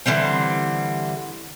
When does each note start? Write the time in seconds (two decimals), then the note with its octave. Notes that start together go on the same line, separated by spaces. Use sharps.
0.06 D3 E3 G3 C4